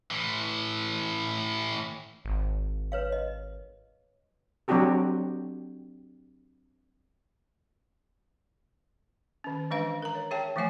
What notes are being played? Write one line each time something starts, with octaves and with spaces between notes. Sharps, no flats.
A2 E3
G#1
B4 C#5 F5
D#5
F#3 C4 D4 F#4 G4 A4
D#3 C#4
E3 G#3 D4 B4 F5
A#4 A#5
C#5
G#4 C#5 E5 G5 A5
E3 F3 A3 E5 G#5